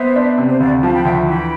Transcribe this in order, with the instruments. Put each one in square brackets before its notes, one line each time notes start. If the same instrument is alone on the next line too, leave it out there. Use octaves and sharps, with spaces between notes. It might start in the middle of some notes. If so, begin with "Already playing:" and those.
Already playing: [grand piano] B3 [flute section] C5 E5
[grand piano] D4
C3
[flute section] C5
[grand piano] D2 [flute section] D5 F5
[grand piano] F3 [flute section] F5 A5
[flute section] G5 B5
[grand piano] D2 [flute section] E5 G5
[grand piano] E3 [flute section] G5 B5